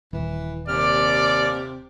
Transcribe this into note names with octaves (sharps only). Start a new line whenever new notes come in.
D#1 E3
D#2 C3 D5 F6